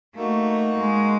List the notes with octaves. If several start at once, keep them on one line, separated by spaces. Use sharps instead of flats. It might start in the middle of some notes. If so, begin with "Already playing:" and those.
A3 A#3 D#4 F#4
G#3